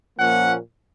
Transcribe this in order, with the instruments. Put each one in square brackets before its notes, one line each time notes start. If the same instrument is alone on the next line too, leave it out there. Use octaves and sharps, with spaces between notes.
[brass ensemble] A#2 F3 A#3 C#4 F#5